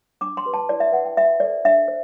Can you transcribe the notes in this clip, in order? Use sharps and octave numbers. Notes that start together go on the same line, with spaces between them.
D4 D6
C6
G4 B4
A5
E4 D5
E5
B4 F#5
G5
F#4 E5
A4 C5 D5
D4 E5
C5